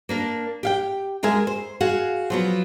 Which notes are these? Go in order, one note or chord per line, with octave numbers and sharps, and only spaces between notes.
A#3 D4 A#4
G4 F5 G5
D2 G#3 A#4 E5 G#5
C5
F#4 G#4 F5 F#5
F3 F#3 B3